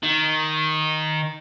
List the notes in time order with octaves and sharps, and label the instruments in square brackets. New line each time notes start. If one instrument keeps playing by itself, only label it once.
[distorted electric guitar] D#3